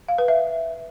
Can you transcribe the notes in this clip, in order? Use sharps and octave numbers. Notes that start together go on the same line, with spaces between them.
F5
B4
E5